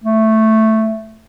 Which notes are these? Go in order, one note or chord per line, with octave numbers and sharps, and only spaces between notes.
A3